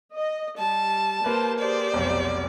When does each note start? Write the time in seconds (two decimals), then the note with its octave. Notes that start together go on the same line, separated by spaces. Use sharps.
0.16 D#5
0.58 G3 A5
1.24 A#3 G4 B4 C5
1.59 G4 G#4 C5 D5
1.94 F1 B1